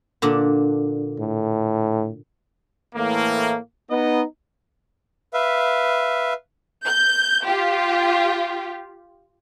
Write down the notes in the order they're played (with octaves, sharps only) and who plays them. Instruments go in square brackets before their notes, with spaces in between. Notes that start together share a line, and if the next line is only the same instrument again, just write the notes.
[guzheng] A#2 D3 D4
[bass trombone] A2
[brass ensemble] A2 E3 A3 A#3
B3 D#4 D#5
[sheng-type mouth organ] B4 E5 F5
[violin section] G6
F4 G4